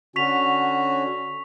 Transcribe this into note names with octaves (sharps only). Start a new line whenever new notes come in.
D3 C#4 F#4 C#6 B6 F7